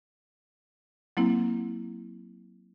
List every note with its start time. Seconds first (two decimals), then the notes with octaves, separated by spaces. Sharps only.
1.17 F#3 A#3 C4 E4